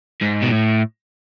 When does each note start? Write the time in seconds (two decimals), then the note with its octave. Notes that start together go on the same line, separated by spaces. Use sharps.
0.21 G#2
0.42 B2
0.51 A2